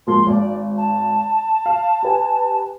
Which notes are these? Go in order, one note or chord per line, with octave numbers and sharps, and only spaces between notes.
G#2 F3 A#3 C6
G#1 D5
A5
F5
G4 B4 G#5